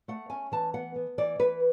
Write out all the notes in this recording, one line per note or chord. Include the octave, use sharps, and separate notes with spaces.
A3 F#5
C#4 G#5
E3 A5
B3 F#5
B3
E3 D5
E3 B4